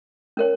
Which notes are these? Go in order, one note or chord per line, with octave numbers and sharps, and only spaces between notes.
C#4 A#4 C#5